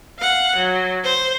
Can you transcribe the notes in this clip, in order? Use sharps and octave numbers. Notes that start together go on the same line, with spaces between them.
F5 F#5
F#3
C5